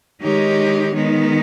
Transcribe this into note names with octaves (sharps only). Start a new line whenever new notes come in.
D#3 G#3 D#4 G4 C#5
D#3 G#3 B3 D#4